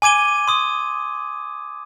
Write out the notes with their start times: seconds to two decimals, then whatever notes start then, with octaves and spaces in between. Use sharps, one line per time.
0.02 G#5 D6 G#6 D#7 G7
0.48 C6 D#6